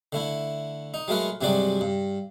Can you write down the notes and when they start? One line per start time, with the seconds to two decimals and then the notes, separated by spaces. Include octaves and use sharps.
0.12 D3 A3 E4
0.94 D#4
1.08 F#3 G#3 A3 A#4 B4
1.41 G2 C3 F#3 G#3 F#4 D5
1.81 G2